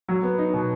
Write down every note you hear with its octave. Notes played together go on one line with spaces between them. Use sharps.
F#3
B3
D#4
B2